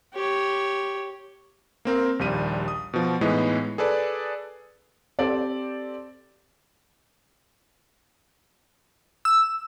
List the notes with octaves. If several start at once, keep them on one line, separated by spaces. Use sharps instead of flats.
G4 C#5
A#3 C4 A#4
A#1 D#2 G3 D#7
D#6
B2 F3
A2 E3 G#3 B3 D#4
G#4 A4 B4 D5
C4 G4 A4 D5
E6